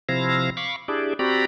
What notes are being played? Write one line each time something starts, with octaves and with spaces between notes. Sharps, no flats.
C3 F3 C4 E4 F5 A#6
F5 B5 C#6 D6
D4 E4 G4 G#4 D5
C4 F#4 G4 D5 A#5 B5